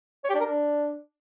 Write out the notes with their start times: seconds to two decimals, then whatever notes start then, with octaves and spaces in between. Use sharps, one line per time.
0.24 C#5
0.29 G4
0.35 D4
0.40 A#4
0.45 D4